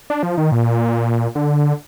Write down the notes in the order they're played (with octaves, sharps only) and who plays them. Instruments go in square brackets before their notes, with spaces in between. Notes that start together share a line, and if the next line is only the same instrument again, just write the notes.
[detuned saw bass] D4
F3
D#3
A#2
D3